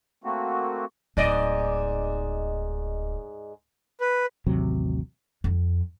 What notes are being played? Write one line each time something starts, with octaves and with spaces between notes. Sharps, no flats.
A3 A#3 C4 F#4
D1 G#2 D5 D#5
B4
A1 D#2 C3 F#3
F2